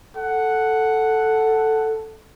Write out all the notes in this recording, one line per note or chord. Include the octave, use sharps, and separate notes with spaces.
A4 F#5